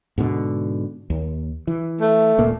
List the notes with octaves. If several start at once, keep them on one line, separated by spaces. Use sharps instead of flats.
G#2 B2 D3
D#2
E3
A3
D#1 A#2 A#3